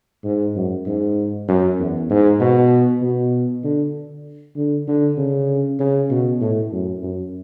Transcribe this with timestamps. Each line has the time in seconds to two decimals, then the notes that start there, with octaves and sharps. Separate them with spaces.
0.24 G#2
0.55 F#2
0.86 G#2
1.48 F#2
1.79 E2
2.09 G#2
2.40 B2
3.02 B2
3.64 D3
4.56 D3
4.88 D3
5.17 C#3
5.80 C#3
6.10 B2
6.41 A2
6.72 F#2
7.03 F#2